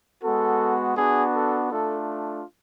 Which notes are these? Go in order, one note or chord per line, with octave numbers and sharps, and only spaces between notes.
G#3 B3 F#4 A4
B3 D4 F#4 G#4
A4
A3 D4 F4 A4